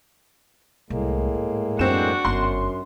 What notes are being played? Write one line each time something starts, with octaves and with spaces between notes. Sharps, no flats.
C2 A2 G#3 A#3
G#2
F#2 C4 D4 F#4 E7
G1 F#2 B3 C6